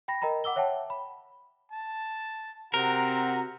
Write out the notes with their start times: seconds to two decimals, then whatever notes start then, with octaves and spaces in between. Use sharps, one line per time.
0.08 G5 B5 A#6
0.22 A#4 D#5 G5 A#5 B5
0.44 F#5 D6 E6 G7
0.56 C#5 E5 F#5 G5 A5
0.90 B5
1.71 A5
2.74 C3 C4 F#4 A#4 F#5 A#5